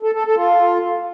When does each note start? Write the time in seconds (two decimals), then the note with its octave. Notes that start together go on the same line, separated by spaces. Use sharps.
0.03 A4
0.14 A4
0.25 A4
0.36 F4